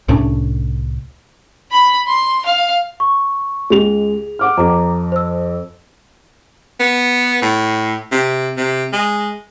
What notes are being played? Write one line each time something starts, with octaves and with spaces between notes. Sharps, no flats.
C2 A2 C#4 D4
B5
C6
F5
C#6
C#2 G#3 G#4 F7
F#5 D6 F6
F2 A#5 D6
C5 E6
B3
A2
C3
C3
G#3